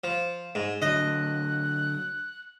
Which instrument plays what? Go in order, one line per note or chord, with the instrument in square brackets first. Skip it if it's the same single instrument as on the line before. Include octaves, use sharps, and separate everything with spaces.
[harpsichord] F3
G#2
[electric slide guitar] D3 F#3 [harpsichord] D#5 [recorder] F#6